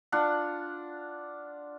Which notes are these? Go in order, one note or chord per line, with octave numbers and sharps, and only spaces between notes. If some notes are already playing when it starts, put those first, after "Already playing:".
D4 F4 F#5